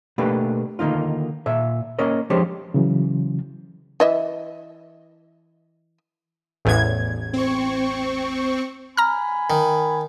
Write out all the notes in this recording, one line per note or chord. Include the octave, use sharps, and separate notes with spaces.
B2 A3 A#3 D4 G4 B4
D3 D#3 A#3 D#4 F4
A#2 E5
A#3 C#4 A#4 C#5 D#5
F3 G#3 D4 G4 C5 C#5
C#3 E3 F#3
E3 D#5 E5
A1 E2 G#6
C4 C#6
G#5 A#5 B5 F6
D#3